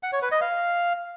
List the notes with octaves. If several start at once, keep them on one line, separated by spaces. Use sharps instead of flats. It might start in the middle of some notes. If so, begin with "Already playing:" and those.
F#5
C#5
B4
D#5
F5